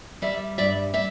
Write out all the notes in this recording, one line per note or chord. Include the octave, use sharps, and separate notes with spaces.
G3 D5 E5
G2 D5 E5
D5 E5